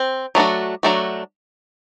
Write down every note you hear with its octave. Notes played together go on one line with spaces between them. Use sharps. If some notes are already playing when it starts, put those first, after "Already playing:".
Already playing: C4
F#3 A3 D4 F#4
F#3 A3 D4 F#4